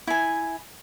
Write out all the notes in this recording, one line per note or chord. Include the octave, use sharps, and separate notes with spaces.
E4 G#5